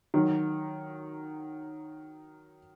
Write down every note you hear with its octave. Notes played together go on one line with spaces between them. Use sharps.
D#3 F#3